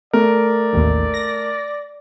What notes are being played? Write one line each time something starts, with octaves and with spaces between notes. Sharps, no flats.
A3 A#4 D5
A1 D#2
A#6